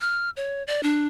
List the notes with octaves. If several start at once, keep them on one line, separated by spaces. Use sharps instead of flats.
F6
C#5
D5
D4